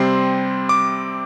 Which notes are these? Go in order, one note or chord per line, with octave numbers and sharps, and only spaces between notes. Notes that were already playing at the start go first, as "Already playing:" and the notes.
Already playing: C3 G3 C4 C6
D6